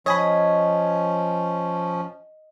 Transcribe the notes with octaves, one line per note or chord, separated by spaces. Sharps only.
F3 C#4 C#5 D#5 G#5 B5